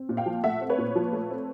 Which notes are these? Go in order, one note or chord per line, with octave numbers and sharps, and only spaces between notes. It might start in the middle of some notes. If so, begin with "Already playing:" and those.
Already playing: C4
A#2
F5 G5
F3
A3 E5 F#5
C4
B4 C#5
A#2
F3
A3
C4